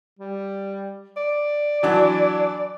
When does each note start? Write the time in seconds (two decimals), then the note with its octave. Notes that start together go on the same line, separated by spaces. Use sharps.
0.19 G3
1.17 D5
1.83 E3 F#3 D4